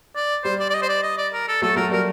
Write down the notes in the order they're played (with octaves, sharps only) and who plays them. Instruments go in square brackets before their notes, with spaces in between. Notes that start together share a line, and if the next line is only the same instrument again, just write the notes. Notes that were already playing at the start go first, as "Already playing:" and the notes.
[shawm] D5
[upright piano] G3 [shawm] C5
[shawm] D5
D5
D#5
C5
D5
D#5
D5
A#4
A4
[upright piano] F#3 A3 [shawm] A4
[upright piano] F#3 A3 [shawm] A#4
[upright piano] G3 A#3 [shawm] A#4